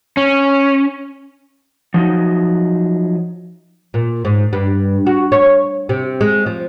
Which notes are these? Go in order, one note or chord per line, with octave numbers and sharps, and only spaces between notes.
C#4
F3 F#3 D#4
A#2
G#2
G2
F#4
C#5
C3
G#3
F3